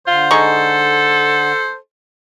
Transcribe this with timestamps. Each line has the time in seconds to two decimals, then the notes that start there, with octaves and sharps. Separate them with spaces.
0.07 D3 F4 C5
0.31 G#3 D#4 A4 C#6